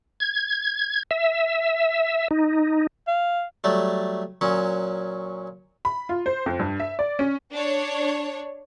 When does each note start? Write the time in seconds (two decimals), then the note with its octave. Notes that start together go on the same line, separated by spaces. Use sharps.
0.20 G#6
1.11 E5
2.31 D#4
3.07 F5
3.64 F#3 G3 A3
4.41 A#2 F#3 C#4
5.85 B5
6.09 F4
6.26 C5
6.46 F2
6.59 G2
6.80 E5
6.99 D5
7.19 C#4
7.52 D4 C#5